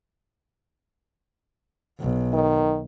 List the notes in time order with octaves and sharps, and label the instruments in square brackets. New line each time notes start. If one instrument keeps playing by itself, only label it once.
[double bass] B1
[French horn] D#3